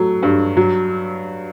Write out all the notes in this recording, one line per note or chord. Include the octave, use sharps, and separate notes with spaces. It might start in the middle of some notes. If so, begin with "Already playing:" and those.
Already playing: F#3 A3
G2
F#3